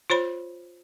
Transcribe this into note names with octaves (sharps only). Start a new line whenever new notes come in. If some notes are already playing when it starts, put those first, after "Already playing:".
F4 C5 C#5 B5